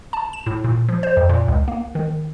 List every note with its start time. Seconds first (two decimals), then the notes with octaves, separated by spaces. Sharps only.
0.13 A5
0.33 E7
0.46 A2
0.64 A#2
0.88 F3
1.03 C5
1.17 F2
1.29 A#2
1.48 C#2
1.68 A#3
1.95 D#3